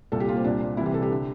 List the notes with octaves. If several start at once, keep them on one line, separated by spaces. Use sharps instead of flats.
C2 A#2 A4
G4
F4
A#3
C4
C2 A#2 D4
C2 C3 E3 E4
G4
A4
G4
D3